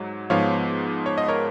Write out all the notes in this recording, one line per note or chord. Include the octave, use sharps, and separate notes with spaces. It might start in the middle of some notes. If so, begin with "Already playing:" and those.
Already playing: G#2 F#3
G#2 F3 B3 C#5 F5
C#5
D#5
A#4 C#5